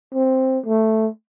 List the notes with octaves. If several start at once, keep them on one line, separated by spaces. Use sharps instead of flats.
C4
A3